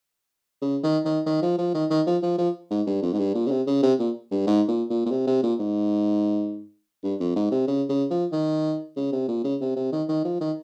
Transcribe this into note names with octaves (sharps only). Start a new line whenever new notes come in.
C#3
D#3
D#3
D#3
F3
F3
D#3
D#3
F3
F3
F3
G#2
G2
F2
G#2
G2
A#2
C#3
C3
C#3
C3
A#2
G2
G#2
A#2
A#2
A#2
C3
C3
A#2
G#2
G2
F2
G#2
C3
C#3
C#3
F3
D#3
C#3
C3
A#2
C#3
C3
C3
D#3
D#3
F3
D#3